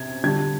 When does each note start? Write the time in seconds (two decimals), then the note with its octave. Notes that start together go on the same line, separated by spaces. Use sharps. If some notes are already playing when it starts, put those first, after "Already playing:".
Already playing: C3 G#6
0.24 D3 G3 G#6